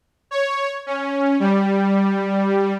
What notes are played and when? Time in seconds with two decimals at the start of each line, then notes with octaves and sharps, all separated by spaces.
0.31 C#5
0.86 C#4
1.40 G3